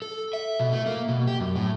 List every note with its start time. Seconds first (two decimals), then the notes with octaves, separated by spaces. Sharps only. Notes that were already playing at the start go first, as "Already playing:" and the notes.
0.02 A4
0.33 E5
0.60 B2
0.72 A3
0.86 A#3
1.08 B2
1.27 G4
1.40 F#2
1.56 A2